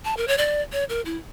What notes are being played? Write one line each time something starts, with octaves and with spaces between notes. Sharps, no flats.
A5
A#4
C#5
D5
C#5
A#4
E4